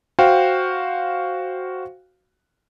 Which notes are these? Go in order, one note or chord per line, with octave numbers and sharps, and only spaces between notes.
F#4 C5 F5 G5